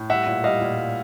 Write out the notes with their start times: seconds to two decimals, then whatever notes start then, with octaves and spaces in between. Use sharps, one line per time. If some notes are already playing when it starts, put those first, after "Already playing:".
Already playing: A2
0.10 G3 E5 F#5
0.27 A#2
0.44 G3 D#5 F5
0.61 A#2
0.78 G3